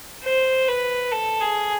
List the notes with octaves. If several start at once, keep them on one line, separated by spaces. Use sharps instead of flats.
C5
B4
A4
G#4